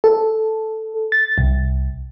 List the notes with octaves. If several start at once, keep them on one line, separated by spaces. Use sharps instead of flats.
A4
A6
C2